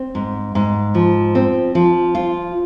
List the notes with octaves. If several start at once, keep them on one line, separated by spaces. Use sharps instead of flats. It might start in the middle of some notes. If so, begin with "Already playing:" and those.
Already playing: C4
G#2
G#2
F3
C4
F3
F4